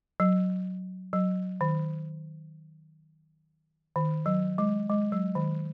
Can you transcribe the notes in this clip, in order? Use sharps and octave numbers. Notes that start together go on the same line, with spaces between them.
F#3
F#3
D#3
D#3
F#3
G#3
G#3
F#3
D#3